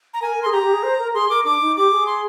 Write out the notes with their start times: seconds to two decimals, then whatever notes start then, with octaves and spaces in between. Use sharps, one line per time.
0.14 A#5
0.21 A#4 G#5
0.37 A#4
0.43 G#4 C6
0.52 G4 A#5
0.62 G4
0.73 G#4
0.83 C5
0.99 A#4
1.14 G#4 C6
1.30 A#4 D6
1.45 D4 D6
1.61 D#4
1.76 G4 D6
1.91 G#4
2.06 C6